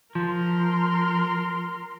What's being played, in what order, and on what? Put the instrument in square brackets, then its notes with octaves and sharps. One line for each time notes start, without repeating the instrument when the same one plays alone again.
[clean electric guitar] F3 [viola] A#4 C6